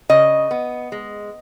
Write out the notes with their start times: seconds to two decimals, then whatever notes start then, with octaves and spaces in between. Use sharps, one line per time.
0.09 C#3 D#5
0.51 B3
0.92 G#3